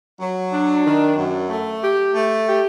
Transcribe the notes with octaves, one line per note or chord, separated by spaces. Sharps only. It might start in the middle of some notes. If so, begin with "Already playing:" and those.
F#3
D4
D#3
F#2
A3
G4
A3
G4